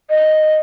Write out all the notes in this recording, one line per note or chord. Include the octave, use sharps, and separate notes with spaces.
D#5